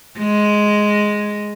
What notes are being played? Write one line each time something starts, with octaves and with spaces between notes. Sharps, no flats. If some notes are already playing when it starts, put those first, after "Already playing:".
G#3